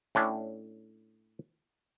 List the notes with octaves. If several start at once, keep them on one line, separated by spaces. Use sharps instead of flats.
A2 C#4 D4